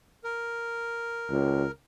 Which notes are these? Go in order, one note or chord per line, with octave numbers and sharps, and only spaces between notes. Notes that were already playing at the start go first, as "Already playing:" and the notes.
A#4
C#2